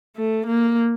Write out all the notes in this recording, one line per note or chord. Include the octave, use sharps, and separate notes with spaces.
A3
A#3